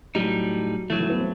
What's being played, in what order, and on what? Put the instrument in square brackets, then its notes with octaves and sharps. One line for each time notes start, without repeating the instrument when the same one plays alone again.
[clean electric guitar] A2 G3 D#4 [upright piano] F#3
[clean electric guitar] G2 F#3 A3 [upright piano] E3
[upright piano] E3
B3
C4